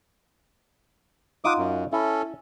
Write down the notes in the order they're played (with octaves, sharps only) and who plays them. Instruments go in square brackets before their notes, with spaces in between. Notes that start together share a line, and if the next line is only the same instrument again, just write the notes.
[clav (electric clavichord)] D#4 F4 F#5 [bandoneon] D6 D#6
[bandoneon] F#2
[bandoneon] C#4 A4 [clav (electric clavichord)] E4